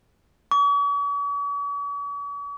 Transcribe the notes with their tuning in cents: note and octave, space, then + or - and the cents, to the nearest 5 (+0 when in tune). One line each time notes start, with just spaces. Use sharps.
C#6 +45